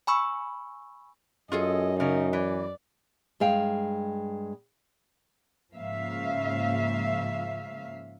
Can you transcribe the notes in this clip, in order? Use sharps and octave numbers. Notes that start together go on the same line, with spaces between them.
G#5 B5 C#6 E6
F#2 F4 G#4 A4 D#5
C#3 D#4 A#4
E3 D5
G2 G#3 F5 G5
G#2 C#3 F3 A#3 E5 F5